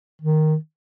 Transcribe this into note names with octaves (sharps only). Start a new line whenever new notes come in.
D#3